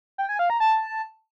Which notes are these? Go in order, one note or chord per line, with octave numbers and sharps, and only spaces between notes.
G5
G#5
F5
A#5
A5